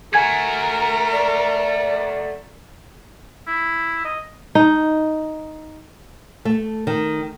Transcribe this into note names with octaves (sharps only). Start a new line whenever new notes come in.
A3 F#4 A#4 G#5 G#6
D5
E4
D#5
D#4
A3
D#3